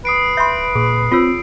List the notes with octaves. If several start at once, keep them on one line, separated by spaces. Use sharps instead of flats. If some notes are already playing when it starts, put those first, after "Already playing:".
B4 D#6 C7 D7
E5 B5 C6 G6
A#2 G#4
C4 F4 C#5 E6